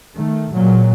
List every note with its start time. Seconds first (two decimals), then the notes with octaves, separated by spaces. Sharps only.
0.15 D#3 A3
0.51 A#2 F#3